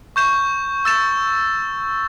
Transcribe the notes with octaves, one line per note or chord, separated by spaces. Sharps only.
C#6 G6 E7
E6 A6 E7